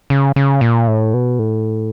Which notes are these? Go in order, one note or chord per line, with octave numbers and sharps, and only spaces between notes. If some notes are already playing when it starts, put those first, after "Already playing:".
C#3
C#3
A#2
A2
B2
A2